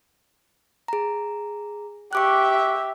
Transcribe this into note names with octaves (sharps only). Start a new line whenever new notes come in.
G#4 A#5
G4 E5 C#6 D6 F#6